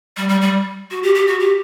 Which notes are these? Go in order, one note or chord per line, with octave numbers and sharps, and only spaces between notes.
G3
G3
G3
F#4
G4
G4
F#4
G4